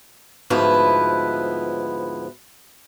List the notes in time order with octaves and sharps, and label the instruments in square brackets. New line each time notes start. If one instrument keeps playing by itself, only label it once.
[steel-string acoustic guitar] D2 G#2 F3 B3 E4 B4